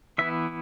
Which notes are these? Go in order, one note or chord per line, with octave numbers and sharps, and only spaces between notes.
E3 B3 E4 E5